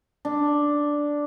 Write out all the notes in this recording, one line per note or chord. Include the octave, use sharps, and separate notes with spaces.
D4